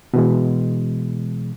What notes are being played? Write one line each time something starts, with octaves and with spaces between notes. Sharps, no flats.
B2 E3 G#3